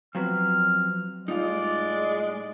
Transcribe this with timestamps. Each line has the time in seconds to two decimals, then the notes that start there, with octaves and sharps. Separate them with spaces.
0.15 F3 F#3 B3 C4 F6
1.28 A2 G3 G#3 D#4 F4 D5